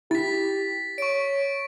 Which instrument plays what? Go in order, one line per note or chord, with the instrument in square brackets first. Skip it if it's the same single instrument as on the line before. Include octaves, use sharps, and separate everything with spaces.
[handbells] E4 [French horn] G4 [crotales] A6 B6
[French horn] C#5 [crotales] C#6 D7